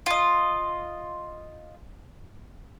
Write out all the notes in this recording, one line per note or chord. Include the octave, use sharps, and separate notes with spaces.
F4 D#5